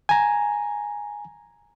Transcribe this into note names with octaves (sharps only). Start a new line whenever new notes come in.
G#5 A#5